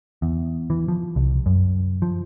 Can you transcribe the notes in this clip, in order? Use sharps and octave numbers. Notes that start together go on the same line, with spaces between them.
E2
E3
F3
C2
F#2
F3